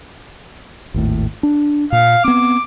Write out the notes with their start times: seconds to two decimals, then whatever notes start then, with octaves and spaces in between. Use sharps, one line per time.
0.94 G#1 D#2 A2
1.43 D4
1.92 A#2 F5
2.24 B3 C4 D6